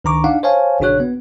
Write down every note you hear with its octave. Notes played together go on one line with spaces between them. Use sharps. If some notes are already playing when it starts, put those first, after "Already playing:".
C#2 D#3 D4 A#5 C#6 D6
D4 D#4 F5 F#5
C5 C#5 F5 G#5 A5
A#1 C#3 D4 F#4 C#5 F#6
B3